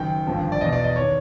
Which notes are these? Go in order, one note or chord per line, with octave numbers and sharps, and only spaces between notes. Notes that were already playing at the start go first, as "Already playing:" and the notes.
Already playing: F#1 F#2 D#3 G5
G#1 G2 D3 F3
D5
E2 B2 D#5
D5
D#5
D#3 C#5